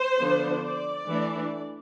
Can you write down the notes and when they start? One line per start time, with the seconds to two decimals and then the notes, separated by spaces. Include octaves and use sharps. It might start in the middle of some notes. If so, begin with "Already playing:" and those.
Already playing: C5
0.19 D3 F3 B3 D4
0.64 D5
1.09 E3 A3 D4